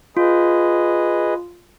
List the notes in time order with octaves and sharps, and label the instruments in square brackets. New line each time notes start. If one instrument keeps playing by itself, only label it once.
[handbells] F4 [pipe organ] G#4 B4 D#5